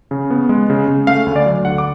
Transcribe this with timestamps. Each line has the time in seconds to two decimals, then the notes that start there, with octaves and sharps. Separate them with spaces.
0.11 C#3
0.30 B3
0.49 G#3
0.70 C#3
0.88 C#3
1.07 A3 F5
1.26 D2
1.36 D5
1.46 F#3
1.65 D3 F#5
1.78 D6